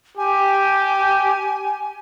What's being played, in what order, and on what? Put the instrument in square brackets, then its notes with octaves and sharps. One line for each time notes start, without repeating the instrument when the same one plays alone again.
[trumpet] G4 [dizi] G#5